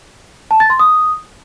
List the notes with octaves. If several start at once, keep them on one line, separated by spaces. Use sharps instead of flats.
A5
A6
C6
D#6